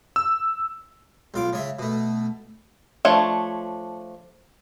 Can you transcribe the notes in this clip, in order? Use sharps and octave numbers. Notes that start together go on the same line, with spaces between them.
E6
B1 F4 D6
C#3 C#5 E5
B2 A3
F3 A3 D4 C#5